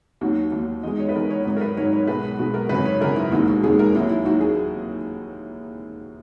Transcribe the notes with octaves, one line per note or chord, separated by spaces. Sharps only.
D#2 D#3 F#3 F#4
D#2 D#3 F#3
E2 D#3 G#3 D#5
C#5
B4
E2 D#3 G#3 A#4
C#5
G#1 G#2 D#3 F#3 C#5
A#4
B4
G#1 G#2 D#3 F#3 C#5
C#5
B1 B2 G#3 B4
B1 B2 G#3 F#4
A#4
G#1 F#2 C#3 B4
C#5
G#1 F#2 C#3 A#4
E4
E1 D#2 D#3 G#3 F#4
F#4
E1 D#2 D#3 G#3 G#4
A#4
D#2 D#3 F#3 E4
E4
D#2 D#3 F#3 F#4
G#4